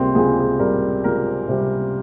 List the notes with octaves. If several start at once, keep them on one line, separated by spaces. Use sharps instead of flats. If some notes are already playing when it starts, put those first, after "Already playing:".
Already playing: C#2 C3 G3 A#3 C4
C#2 G#4
G#4
C3 G3 A#4
C#2 A#4
C3 G3